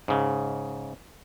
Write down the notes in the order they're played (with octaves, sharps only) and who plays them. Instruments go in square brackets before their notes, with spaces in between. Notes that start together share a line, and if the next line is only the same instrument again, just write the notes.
[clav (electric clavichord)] G#2 C#3